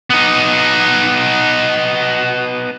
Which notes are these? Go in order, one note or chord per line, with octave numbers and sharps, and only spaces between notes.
B3 D#4